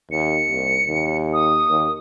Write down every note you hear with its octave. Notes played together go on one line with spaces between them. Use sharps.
D#2 C#7
C2
D#2
D#6
D#2